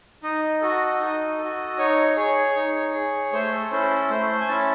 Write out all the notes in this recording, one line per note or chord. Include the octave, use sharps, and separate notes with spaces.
D#4 D#5
F#4 A4
D#4
F#4 A4
D#4 C#5
G#4 C#5
D#4
G#4
A3 C5
A4
C#4 E4 A4 C5
A4
A3 C5
G#5
C#4 E4 A4 A5